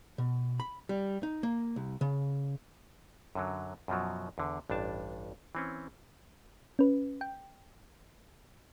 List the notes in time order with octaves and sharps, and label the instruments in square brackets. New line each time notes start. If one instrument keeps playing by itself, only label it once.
[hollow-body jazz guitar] B2
B5
G3
D#4
A#3
C2
C#3
[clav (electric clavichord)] F#2 D3 F#3
F#2 B2 F3 F#3
E2 D3
A1 G2 D4 A5
E3 C4 C#4
[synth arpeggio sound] C#4 B4
G5